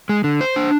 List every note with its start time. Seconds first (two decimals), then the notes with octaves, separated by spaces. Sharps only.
0.09 G#3
0.24 D3
0.41 C5
0.56 D4